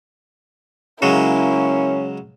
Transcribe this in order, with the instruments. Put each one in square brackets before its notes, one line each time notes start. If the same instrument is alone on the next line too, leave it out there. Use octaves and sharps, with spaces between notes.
[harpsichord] C#3 F#3 G#3 [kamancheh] A#3 E4 [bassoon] C#4